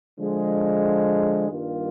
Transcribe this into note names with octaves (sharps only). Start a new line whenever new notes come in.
D3 F3 G#3
G2 D#3 G3 A#3 F4